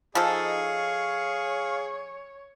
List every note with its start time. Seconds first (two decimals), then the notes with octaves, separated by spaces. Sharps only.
0.15 F3 D#4 G#4 A4 F5 C#6
0.64 C#5